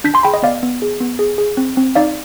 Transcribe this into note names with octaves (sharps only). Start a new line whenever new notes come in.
D4 G6 B6
G#5 C6
G#4 G5 B5
D#5
B3 D5 F5
B3
G#4
B3
G#4
G#4
C4
C4
D#4 D5 F5